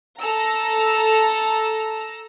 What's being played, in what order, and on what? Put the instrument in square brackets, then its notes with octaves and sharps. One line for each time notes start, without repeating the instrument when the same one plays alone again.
[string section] A4 A#5 E6